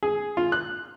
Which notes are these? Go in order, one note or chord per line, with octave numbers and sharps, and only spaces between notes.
G#4
F4
F#6